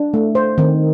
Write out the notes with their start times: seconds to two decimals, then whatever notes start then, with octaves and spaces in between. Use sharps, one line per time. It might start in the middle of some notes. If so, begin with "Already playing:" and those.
Already playing: D4
0.14 A3
0.35 C5
0.58 D#3 C4